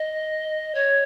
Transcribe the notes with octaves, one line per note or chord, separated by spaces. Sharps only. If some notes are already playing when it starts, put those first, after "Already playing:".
Already playing: D#5
C#5